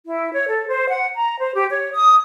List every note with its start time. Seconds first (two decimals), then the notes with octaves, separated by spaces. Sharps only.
0.05 E4
0.33 C#5
0.48 A4
0.68 C5
0.88 F#5
1.15 A#5
1.39 C5
1.54 G4
1.70 C#5
1.93 D#6